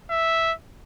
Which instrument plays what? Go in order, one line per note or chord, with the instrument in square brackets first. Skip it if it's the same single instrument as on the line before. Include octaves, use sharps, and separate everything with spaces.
[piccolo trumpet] E5